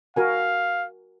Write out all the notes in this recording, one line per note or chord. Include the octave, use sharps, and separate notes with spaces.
F#4 A#4 F5 G#5